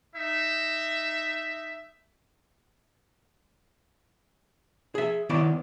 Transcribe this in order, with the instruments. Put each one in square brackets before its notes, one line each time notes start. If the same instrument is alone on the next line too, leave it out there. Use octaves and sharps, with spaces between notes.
[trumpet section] D#4 E5
[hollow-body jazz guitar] G#4 E5
D#3 B3 E4 C#5 D5